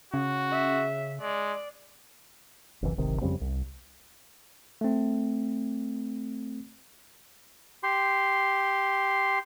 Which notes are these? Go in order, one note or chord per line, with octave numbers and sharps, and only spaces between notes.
C#3 F#4
E5
G#3 D5
F#1 C2 E3
D1 G#1 C3 D#3
F2 C#3 G3 C4
C2
A3 C4
G4 C6